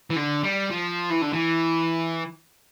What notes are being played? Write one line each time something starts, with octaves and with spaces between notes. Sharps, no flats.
E3
D3
G3
F3
E3
D3
E3